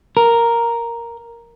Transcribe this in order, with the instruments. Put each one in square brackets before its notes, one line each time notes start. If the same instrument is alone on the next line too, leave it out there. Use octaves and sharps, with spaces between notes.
[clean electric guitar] A#4